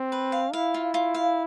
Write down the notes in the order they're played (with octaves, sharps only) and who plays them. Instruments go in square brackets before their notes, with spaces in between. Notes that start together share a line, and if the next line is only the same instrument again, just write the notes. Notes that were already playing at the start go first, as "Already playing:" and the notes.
Already playing: [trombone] C4
[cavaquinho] B4
F5
[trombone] E4 [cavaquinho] F5
[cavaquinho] F4
F4
F5